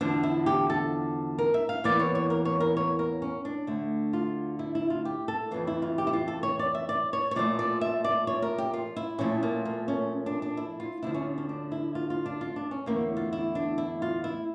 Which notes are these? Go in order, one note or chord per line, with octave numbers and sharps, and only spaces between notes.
E2 D3 F3 D4
E4
G4
A4
A#4
E5
F5
E2 E3 A#3 D5
C#5
C#5
A#4
C#5
A#4
C#5
A#4
C#4
D4
D2 D3 A3
F4
E4
E4
F4
G4
A4
F2 C#3 E3 F4
E4
F4
G4
E4
F4
A4
C#5
D5
E5
D5
C#5
C#5
A#2 F3 A3 D5
D5
E5
D5
C#5
A#4
G4
F4
E4
A#2 F3 A3 C#4
A#3
A#3
C#4
D4
D4
E4
F4
D2 D3 F3 E4
C#4
C#4
D4
E4
F4
F4
D4
F4
D4
C#4
E2 D3 A3 A#3
F4
E4
D4
E4
F4
E4